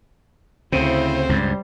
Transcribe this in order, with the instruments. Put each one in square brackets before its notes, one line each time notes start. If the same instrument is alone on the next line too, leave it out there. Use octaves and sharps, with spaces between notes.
[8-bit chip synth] D2 C4 [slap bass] C#3 [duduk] E4 [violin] C5
[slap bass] C#2 G2 [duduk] G3